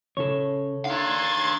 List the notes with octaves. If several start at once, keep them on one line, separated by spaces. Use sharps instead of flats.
C#3 A4 C#5
D4 D#4 F5 C6 G#6 A6